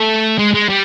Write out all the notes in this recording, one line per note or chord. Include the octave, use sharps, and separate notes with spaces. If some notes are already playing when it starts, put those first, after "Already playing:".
Already playing: A3
G#3
G#3
G3